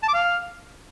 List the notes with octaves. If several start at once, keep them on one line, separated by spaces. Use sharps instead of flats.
A5
D6
F5